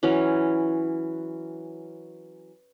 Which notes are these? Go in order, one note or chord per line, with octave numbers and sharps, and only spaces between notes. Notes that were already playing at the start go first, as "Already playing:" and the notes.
E3 F#3 C#4